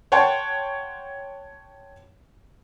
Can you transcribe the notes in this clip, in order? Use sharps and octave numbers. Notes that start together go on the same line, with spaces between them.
C#5 F#5 G5 A5 C6